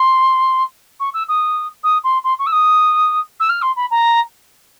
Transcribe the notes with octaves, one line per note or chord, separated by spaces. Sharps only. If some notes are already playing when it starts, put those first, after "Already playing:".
Already playing: C6
C#6
E6
D#6
D#6
C6
C6
C#6
E6
D#6
E6
F6
C6
B5
A#5